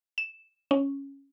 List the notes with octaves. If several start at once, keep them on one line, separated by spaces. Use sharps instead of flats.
E7
C#4